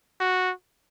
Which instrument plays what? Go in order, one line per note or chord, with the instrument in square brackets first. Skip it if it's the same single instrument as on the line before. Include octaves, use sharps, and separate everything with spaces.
[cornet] F#4